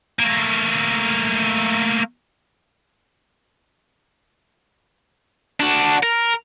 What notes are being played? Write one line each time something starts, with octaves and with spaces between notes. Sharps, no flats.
A3 A#3
D4 F#4
A#4